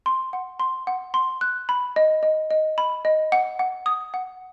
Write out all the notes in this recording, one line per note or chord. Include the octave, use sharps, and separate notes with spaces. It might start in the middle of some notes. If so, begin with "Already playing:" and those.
C6
F#5
C6
F#5
C6
F#6
B5
D#5
D#5
D#5
B5
D#5
F#5
F#5
D#6
F#5